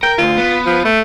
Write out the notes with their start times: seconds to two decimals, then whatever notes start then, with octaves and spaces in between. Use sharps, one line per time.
0.03 A#4 G5
0.18 D2 F4
0.37 B3
0.66 F3
0.85 A3